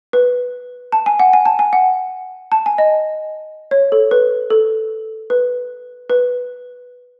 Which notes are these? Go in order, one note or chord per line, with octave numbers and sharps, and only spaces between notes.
B4
A5
G#5
F#5
G#5
A5
G#5
F#5
A5
G#5
D#5
C#5
A4
B4
A4
B4
B4